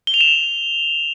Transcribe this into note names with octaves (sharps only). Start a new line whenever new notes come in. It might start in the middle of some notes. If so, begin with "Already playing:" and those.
G7
F7
E7